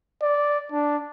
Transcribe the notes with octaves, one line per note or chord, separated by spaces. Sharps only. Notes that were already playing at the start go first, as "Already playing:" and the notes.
D5
D4